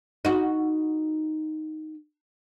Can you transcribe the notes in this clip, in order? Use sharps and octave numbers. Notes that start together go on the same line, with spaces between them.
D#4 F#4